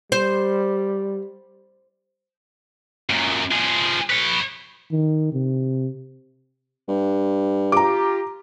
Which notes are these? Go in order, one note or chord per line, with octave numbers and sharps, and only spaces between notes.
G3 C5
F#2 A#2
F3 G#4
B4 C#5
D#3
C3
G2
F4 G4 A#5 D6